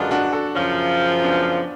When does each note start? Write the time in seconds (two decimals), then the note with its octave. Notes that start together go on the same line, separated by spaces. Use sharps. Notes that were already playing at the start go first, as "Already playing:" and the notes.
Already playing: F#2 D3 G#3 B3 D4 F4 F#4
0.11 D4 F#4
0.33 F#4 A4
0.55 F#2 C#3 F3 C#4 F4
1.23 B3 D4